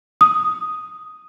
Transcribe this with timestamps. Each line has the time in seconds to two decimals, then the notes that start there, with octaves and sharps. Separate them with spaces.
0.21 D#6